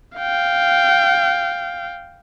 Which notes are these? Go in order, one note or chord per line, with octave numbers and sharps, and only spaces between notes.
F5 G5